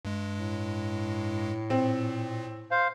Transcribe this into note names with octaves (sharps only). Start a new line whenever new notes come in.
G2 G#3
A2
A#2 C4
C5 F5